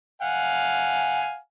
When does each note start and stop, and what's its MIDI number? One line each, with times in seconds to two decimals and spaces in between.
0.22 1.37 77
0.22 1.37 78
0.22 1.37 80